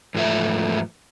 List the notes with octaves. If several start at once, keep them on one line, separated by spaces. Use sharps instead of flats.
E2 G#2 F3 A3 E5